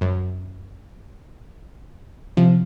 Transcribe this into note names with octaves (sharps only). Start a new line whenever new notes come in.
F#2
C3 F3